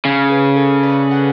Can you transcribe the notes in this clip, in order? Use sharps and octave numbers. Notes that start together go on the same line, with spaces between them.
C#3
G#4 B4
A4 C#5
B4 D5
F#5